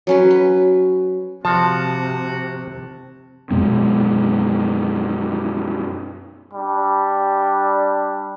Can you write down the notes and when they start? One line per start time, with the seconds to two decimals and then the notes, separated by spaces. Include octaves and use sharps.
0.07 F#3 C#4 B4
0.31 B4
1.45 C3 F3 F#4 A5
3.51 F#2 B2 G#3 C4
6.53 G3 D4